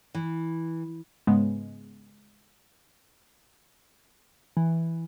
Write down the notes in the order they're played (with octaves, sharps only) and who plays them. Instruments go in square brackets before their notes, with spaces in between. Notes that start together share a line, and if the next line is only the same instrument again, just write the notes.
[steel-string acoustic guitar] E3
[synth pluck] G#2 C#3 G#3 B3
E3